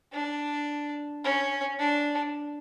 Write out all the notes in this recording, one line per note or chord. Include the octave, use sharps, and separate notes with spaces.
D4
C#4
D4